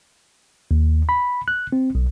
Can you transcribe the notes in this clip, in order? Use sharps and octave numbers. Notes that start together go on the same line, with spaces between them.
D#2
B5
F#6
C4
B1